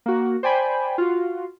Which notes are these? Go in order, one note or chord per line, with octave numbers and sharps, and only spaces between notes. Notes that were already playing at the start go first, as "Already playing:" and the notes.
A#3 F#4
C5 D5 G5 G#5 B5
F4 F#4